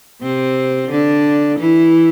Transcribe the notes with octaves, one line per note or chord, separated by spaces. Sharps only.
C3 C4
D3 D4
E3 E4